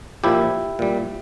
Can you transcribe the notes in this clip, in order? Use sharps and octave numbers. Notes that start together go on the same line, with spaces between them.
A#2 F3 E4 G4
A#2 G3